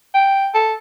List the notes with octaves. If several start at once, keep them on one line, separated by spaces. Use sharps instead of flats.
G5
A4